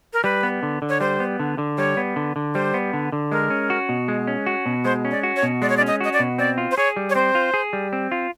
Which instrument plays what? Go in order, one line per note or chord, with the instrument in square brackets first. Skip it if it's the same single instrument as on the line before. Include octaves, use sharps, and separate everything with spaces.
[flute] A#4
[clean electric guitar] G3 [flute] B4
[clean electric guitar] B3
D3
D3
[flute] C#5
[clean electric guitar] G3 [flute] C5
[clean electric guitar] B3
D3
D3
[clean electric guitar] G3 [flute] C#5
[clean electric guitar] B3
D3
D3
[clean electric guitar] G3 [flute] C5
[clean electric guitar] B3
D3
D3
[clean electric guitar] G#3 [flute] A#4
[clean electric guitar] C#4
F#4
B2
G#3
C#4
F#4
B2
[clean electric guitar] G#3 [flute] C5
[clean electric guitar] C#4
[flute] D5
[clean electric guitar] F#4
[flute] C#5
[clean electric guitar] B2
[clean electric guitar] G#3 [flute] D5
[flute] C#5
D5
[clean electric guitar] C#4
[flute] D#5
[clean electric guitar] F#4 [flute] D#5
[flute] D5
[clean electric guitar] B2
[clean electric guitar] C4 [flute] D5
[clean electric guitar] F4
[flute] C5
[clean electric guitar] G#4 [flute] C#5
[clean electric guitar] G3
[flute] C#5
[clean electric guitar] C4 [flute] C5
[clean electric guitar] F4
G#4
G3
C4
F4